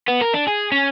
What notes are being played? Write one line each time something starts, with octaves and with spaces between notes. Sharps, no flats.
B3
A#4
D4
G#4
C#4